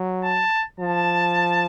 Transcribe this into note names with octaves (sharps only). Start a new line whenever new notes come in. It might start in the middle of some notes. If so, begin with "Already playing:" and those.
Already playing: F#3
A5
F3 A5